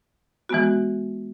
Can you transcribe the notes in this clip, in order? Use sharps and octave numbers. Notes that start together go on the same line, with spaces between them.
E3 G#3 B3 F#4